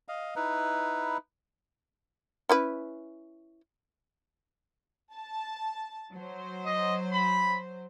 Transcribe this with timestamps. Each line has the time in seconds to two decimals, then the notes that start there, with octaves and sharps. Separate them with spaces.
0.08 D#5 F5
0.36 D#4 E4 B4
2.49 C#4 E4 B4
5.12 A5
6.14 F#3 C5
6.65 D#5
7.13 B5